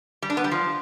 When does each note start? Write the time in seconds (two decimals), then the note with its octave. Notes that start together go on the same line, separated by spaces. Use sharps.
0.22 G3
0.30 D4
0.37 B3
0.44 G3
0.51 F3